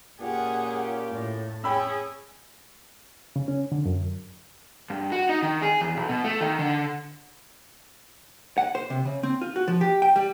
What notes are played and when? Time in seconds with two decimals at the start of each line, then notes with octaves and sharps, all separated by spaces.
0.20 A#2 A#3 C#4 G4 G#4 F#5
1.12 A2
1.64 C#4 G#4 G5 B5 E6
3.36 C#3
3.48 C#4
3.72 D3
3.86 F#2
4.90 G2
5.12 F#4
5.29 D#4
5.43 D#3
5.62 G#4
5.81 E2
5.97 B1
6.09 B2
6.24 A3
6.41 D#3
6.59 D3
8.58 F#5
8.75 C5
8.90 C3
9.05 C#3
9.23 C4
9.41 F4
9.56 F#4
9.68 F3
9.81 G4
10.02 G5
10.16 G3